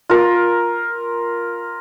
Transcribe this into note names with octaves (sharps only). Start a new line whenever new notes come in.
F4 A#4